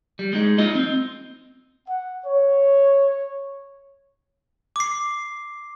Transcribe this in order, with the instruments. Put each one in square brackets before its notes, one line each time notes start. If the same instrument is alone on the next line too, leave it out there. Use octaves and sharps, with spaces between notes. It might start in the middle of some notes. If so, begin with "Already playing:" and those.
[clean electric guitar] G3
G#3 D#4
D#4 F4 D#5
C4
[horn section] F#5
C#5
[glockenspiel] D6 C7